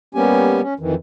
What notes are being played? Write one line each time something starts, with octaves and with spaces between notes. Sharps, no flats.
G3 A#3 B3 C#4 G4 G#5
C#4
F2 D#3 E3